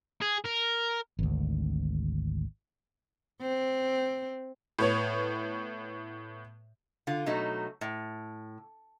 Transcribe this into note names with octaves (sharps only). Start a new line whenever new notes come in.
G#4
A#4
G#1 D2
C4
A2 B3 C#5
D3 F4
B2 F#3 A3 D#4
A2